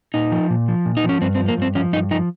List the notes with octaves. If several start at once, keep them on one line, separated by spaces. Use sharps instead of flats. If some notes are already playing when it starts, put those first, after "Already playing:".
A#2 D#4
F3
A#2
F3
A#2
D#4
F3
C#4
G2 C4
C4
F3
A#3
G2 C4
F3 C#4
G2 D#4
F3 D#4